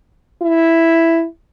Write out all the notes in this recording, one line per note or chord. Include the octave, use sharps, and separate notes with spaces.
E4